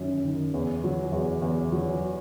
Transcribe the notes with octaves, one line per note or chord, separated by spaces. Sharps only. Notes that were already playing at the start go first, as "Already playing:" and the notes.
Already playing: F#2 D#3
D#3
E2
F#3
E2
E2
F#3